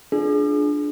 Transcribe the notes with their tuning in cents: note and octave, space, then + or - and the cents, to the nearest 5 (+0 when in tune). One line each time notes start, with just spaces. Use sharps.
D4 +5 F4 +0 G#4 +25